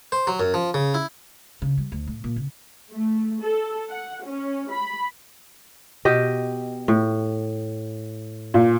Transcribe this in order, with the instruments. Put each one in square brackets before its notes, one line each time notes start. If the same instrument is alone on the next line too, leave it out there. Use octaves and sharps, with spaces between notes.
[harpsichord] C5
F#3
F#2
F3
C#3
E4
[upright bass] C#3
G3
D2
A2
A#2
C#3
[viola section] A3
A4
F#5
C#4
B5
[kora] B2 G4 D#5
A2
[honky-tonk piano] A#2